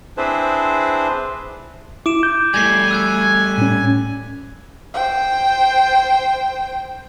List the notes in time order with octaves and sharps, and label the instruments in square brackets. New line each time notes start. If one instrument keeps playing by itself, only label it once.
[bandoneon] C4 D4 E4 G#4 B4 C5
[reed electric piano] E4 [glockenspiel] D6 D7 E7
[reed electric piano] G6
[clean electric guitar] G3 A3 [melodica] G#5 [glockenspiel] G#6 A#6 C7
[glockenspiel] E6 F#6 G#6
[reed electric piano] A2 C#4
[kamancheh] C5 G5